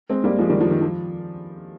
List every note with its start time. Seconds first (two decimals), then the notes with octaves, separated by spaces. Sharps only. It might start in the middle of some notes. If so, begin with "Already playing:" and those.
0.10 G#3 C4
0.24 G3 A#3
0.39 F3 G#3
0.49 D#3 G3
0.60 F3
0.70 D#3
0.81 F3